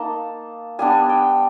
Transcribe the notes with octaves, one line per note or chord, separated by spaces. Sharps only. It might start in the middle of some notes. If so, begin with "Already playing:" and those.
Already playing: A#3 D#4 A5
G3 B3 D4 G#5
G5